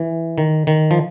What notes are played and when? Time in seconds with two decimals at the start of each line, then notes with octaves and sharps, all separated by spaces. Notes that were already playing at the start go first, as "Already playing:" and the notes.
Already playing: E3
0.38 D#3
0.67 D#3
0.91 F3